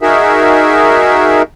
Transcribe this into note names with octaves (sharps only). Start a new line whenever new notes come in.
D#4 F#4 G#4 A#4 E5